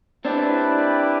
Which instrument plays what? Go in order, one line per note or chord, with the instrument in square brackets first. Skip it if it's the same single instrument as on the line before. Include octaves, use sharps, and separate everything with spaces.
[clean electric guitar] C4 D4 [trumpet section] E4 G4 B4 D5 G5